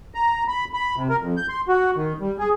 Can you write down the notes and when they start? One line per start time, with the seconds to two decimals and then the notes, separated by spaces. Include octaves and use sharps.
0.14 A#5
0.48 B5
0.73 B5
0.96 C3
1.10 A#4
1.21 F2
1.37 G6
1.49 C6
1.68 F#4
1.96 D#3
2.20 G3
2.39 G#4